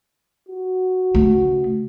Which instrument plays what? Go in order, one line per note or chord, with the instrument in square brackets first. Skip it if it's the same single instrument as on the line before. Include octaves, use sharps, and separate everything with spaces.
[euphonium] F#4
[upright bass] C#3 A3